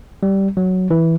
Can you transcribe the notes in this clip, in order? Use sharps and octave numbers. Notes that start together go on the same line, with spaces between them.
G3
F#3
E3